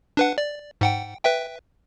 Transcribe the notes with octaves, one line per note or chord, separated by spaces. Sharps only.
D4 B4 F#5
D5
G#2 F#5 G5
B4 E5 G5